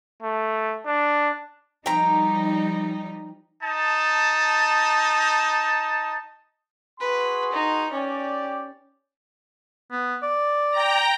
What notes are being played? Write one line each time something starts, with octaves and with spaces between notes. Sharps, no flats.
A3
D4
F3 G3 D#4 G5 A#5
D#4 A5
F#4 G#4 B4 C6
D#4
C#4 G4 D5
B3
D5
G5 A#5